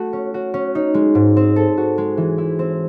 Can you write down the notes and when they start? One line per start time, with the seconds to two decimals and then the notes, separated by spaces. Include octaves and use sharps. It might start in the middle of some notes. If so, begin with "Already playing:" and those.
Already playing: A3 F#4
0.13 C#4
0.34 F#4
0.54 C#4
0.75 D#4
0.94 G#3
1.15 G#2
1.37 C4
1.56 A4
1.77 F#4
1.98 G#3
2.17 E3
2.38 E4
2.59 C4